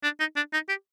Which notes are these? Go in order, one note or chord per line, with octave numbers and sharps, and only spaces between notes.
D4
D#4
D4
D#4
G4